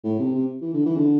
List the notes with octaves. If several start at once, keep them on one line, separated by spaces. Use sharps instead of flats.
A2
C3
C3
E3
D3
E3
D3